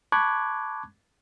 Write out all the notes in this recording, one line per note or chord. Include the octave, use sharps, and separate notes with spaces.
A5 B5 C#6 D6 F#6 G#6